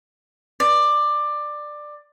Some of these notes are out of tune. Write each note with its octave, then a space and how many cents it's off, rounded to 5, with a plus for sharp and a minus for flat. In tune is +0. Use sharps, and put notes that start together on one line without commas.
D5 +15